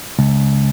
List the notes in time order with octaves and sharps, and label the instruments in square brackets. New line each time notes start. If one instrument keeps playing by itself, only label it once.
[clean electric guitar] C#2